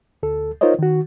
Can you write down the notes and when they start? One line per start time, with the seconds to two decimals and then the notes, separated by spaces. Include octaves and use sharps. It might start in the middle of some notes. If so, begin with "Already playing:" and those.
0.23 D2 A4
0.61 D#4 F4 A#4 C5 C#5 D#5
0.79 D#3 F#4